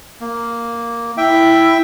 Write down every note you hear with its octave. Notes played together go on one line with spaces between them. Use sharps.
A#3
E4 E5 G5